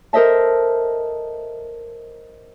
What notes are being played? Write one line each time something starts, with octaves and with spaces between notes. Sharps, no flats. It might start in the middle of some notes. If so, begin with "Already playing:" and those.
A4 A#4 C5 D#5 E5 A5